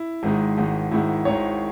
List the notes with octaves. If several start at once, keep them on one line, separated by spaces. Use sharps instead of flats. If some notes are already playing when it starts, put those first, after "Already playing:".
Already playing: E4
G#1 G#2 D#3 G#3
G#1 G#2 D#3 G#3
G#1 G#2 D#3 G#3 E4
G#1 G#2 D#3 G#3 C#5